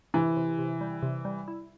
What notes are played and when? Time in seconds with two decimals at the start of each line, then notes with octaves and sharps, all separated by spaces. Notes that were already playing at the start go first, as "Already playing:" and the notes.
0.14 C3 E3
0.37 C3
0.59 C3
0.81 G3
1.03 C3
1.25 G3
1.48 E4